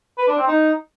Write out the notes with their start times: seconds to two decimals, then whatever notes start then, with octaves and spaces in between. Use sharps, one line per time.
0.18 B4
0.28 D4
0.38 C4
0.47 D#4